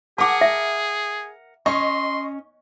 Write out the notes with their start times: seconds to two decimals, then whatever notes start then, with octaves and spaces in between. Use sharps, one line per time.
0.18 G#4 A#4 F#5 A5 D6
0.41 E5
1.66 C#4 D#5 C6 C#6